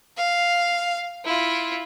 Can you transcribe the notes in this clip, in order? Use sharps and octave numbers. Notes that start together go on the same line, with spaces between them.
F5
E4 F4